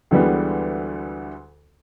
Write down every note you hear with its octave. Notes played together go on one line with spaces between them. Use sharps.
D2 D3 E3 G3 G#3 B3